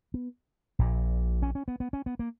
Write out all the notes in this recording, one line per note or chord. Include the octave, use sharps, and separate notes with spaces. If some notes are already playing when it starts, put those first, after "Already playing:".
B3
A#1 A#2
C#4
C#4
B3
B3
C#4
B3
A#3